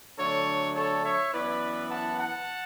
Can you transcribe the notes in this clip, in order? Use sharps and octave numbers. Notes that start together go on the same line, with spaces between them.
D3 F#3 A3 D4 A4 C#5
A4 C#5
C#5 E5
F#2 E3 B3 E4 B4 D5
F#5 A5
F#5 A5